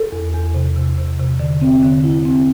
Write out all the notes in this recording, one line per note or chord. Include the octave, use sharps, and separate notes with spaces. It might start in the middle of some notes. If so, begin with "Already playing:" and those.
Already playing: A4
E2
E2
C3
C3
C3
C3
D3
C4
D3
E4
C4